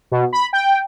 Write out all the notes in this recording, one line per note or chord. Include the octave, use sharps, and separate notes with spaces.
B2
B5
G5